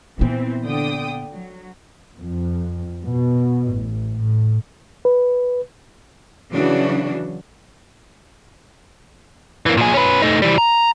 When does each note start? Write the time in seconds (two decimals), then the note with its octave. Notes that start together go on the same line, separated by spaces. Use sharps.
0.19 A#2 E3 B3 C4
0.64 D3 G5 D#6
1.32 F#3
2.19 F2
3.04 B2
3.72 A1
4.14 A2
5.05 B4
6.52 C#3 E3 F#3 D4 F#4
9.66 E3 A#3
9.77 A#2 G#4
9.94 C#4 B4
10.22 A3 D#4
10.42 E3 G3
10.58 A#5